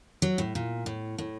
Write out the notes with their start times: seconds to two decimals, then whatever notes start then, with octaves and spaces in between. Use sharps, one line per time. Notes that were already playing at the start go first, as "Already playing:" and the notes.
0.22 F#3
0.38 A2
0.55 A#2
0.86 A2
1.18 A2